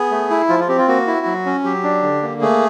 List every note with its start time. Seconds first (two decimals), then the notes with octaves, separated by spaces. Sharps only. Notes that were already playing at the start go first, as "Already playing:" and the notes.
Already playing: B3 G#4
0.11 A3
0.30 E4
0.49 F3 F4
0.59 F4
0.68 C4 G4
0.79 F4
0.88 A#3 F#4
1.07 E4
1.26 F#3
1.46 C#4
1.64 F#3 G4
1.83 D4
2.02 D3
2.22 A#3
2.41 A3 G#4